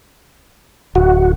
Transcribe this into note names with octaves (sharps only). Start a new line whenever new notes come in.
D1 F#4